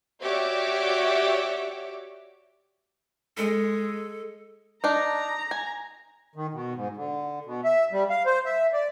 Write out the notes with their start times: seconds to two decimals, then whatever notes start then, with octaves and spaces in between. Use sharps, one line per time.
0.22 F#4 G4 C#5 D5 E5 D6
3.37 G#3 A4
4.84 D4 D#4 A#5
5.51 G#5
6.35 D#3
6.53 B2
6.75 G#2
6.97 D3
7.45 B2
7.64 E5
7.92 G3
8.10 F5
8.26 C5
8.46 E5
8.73 D5